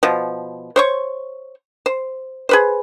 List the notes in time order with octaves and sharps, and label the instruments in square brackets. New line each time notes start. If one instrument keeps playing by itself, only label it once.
[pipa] B2 F3
C5 C#5 C#6
C5
G#4 B4 C5